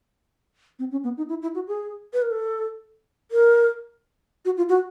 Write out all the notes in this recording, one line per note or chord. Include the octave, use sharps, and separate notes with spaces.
C4
C#4
B3
D#4
E4
E4
F#4
G#4
B4
A#4
A4
A#4
F#4
F4
F#4